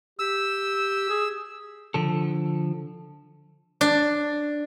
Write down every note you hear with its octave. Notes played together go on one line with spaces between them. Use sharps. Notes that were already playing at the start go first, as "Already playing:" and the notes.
G4 E6
G#4
D3 F3 A4
D4